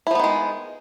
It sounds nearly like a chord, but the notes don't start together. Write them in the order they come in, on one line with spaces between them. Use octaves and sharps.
E4 F3 B3 D#3 G#3